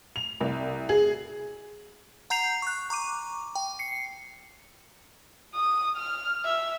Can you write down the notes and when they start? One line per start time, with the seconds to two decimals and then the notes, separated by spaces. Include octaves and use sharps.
0.16 F7
0.41 C2
0.89 G#4
2.30 F#5 A#5 G6 C7 F7
2.62 C#6 F#6
2.90 A#5 C#6 D6 D#7
3.55 G5
3.79 C7 C#7
5.55 D#6
5.97 F6
6.45 E5